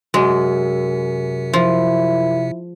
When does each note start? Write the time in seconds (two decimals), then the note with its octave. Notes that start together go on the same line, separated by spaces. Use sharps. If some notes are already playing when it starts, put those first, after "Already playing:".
0.14 F#2 C3 G#3
1.53 F3 E4